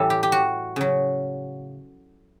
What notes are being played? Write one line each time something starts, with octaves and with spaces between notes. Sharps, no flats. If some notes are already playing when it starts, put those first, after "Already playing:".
Already playing: A2 E3 G3 A4
G4
G4
F#4
C#3 F#3